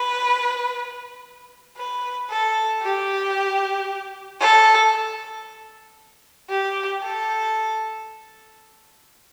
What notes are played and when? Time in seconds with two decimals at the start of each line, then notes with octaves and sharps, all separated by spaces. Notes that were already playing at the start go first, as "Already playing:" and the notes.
Already playing: B4
1.77 B4
2.30 A4
2.82 G4
4.40 A4
6.50 G4
7.02 A4